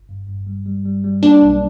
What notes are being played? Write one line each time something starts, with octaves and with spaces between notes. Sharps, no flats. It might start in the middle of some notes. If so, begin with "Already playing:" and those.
Already playing: G1
G2
G2
G3
G3
G3
G3
A#3 D4
B1